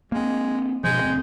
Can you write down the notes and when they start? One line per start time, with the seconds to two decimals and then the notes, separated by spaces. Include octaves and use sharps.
0.12 G#3 A#3 C4
0.84 G2 B2 F3 G#3 G6
1.01 D#1 D2 C4